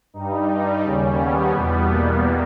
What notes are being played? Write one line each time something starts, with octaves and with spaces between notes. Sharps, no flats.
G2 G3 D#4
D#2 C#3 G3 C#4
B3
E2 B2 G3
A#3